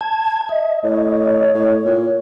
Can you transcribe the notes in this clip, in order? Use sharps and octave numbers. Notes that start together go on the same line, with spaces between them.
A5 G#6
D#5 E5
A2 C#5
A2
A#2